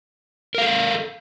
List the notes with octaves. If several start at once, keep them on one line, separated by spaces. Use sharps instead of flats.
A4 A#4 F5